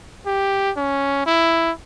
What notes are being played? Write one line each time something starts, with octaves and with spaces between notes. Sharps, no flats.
G4
C#4
E4